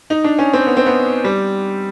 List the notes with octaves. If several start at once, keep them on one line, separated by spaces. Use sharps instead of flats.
D#4
D4
C#4
C4
B3
C4
B3
G3